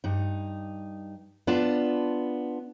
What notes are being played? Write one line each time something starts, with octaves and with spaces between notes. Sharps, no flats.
G2 D#4
B3 D4 F4 D5 A5